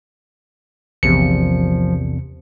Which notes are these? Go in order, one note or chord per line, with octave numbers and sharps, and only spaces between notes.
A#1 E2 C3 F3 C#7